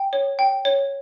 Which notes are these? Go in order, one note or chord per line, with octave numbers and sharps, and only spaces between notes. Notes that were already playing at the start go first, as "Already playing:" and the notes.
Already playing: G5
C#5
G5
C#5